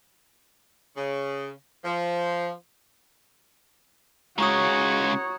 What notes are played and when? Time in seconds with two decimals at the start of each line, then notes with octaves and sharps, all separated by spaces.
0.97 C#3
1.85 F3
4.38 C#3 G#3 F#4 C#5 A#5 C#6 D#6